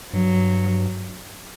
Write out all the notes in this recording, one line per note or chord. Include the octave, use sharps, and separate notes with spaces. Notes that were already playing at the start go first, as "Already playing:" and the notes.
G2 F#3